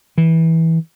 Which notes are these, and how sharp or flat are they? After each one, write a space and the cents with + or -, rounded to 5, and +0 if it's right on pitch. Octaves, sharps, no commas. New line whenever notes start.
E3 -20